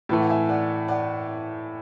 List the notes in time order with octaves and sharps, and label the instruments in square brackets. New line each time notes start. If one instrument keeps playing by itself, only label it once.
[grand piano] A2 E3 A3
[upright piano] F#5
E5 G#5
D5 F#5
D5 F#5